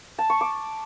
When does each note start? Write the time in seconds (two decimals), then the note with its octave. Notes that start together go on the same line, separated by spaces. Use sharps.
0.18 A5
0.30 C#6
0.41 D6